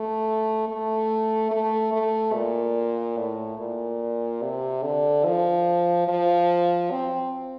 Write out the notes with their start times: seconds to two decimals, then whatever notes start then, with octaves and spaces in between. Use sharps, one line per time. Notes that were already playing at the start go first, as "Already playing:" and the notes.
Already playing: A3
0.68 A3
1.51 A3
1.93 A3
2.34 A#2
3.18 A2
3.59 A#2
4.42 C3
4.83 D3
5.26 F3
6.08 F3
6.91 C4